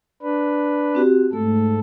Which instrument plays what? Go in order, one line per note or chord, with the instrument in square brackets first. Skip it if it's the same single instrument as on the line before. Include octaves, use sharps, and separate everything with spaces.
[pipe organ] D4 B4
[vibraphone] C4 F#4 G4
[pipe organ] G#2 A4 [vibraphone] A3